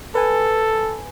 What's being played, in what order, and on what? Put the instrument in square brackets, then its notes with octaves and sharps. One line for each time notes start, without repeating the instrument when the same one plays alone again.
[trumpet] A4 [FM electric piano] B4 G#5